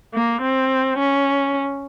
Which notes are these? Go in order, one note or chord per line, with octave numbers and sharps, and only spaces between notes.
A#3
C4
C#4